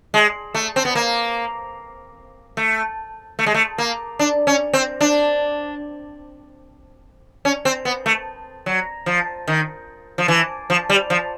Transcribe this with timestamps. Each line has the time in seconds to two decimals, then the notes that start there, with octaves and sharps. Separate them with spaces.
0.14 G#3
0.55 A3
0.76 C4
0.85 B3
0.95 A#3
2.57 A3
3.39 A3
3.46 G#3
3.54 A3
3.78 A#3
4.19 D4
4.47 C#4
4.73 C4
5.01 D4
7.45 C#4
7.65 C4
7.85 B3
8.06 A3
8.66 F#3
9.06 F3
9.48 D#3
10.18 F3
10.28 E3
10.70 F3
10.90 G3
11.10 F3